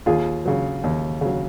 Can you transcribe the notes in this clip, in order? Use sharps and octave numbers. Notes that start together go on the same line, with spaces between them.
D#2 F4 G#4
C#3 F#3
D#2
C#3 F#3